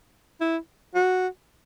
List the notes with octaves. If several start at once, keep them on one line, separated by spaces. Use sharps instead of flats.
E4
F#4